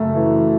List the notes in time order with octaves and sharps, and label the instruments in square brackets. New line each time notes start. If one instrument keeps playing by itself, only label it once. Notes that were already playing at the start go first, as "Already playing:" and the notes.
Already playing: [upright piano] F#2 C#3 A3
E3